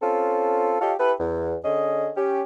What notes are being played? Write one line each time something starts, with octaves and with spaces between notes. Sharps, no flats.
C4 C#4 F4 A4
F4 G4 A4 C#5 D#5 F5
E4 G4 A4 B4
E2
D3 C#4 G#4 D#5
C#4 G4